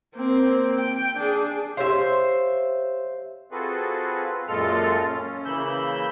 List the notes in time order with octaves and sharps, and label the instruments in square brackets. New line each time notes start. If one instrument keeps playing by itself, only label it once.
[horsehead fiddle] A#3 C4
G5
D4 G#4
[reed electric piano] G4 C#5 F5 [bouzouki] C5 E5
[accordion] C4 F4 F#4 G#4 A4 B4
F#2 A#2 G#3 F4 A4 F6
C#4
C#3 E3 A#3 B5 E6 G6